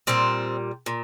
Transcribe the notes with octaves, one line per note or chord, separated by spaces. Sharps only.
A#2 G3 C4
A#2